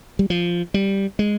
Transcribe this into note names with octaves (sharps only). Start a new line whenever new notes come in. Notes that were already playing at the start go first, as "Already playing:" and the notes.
G3
F3
G3
G#3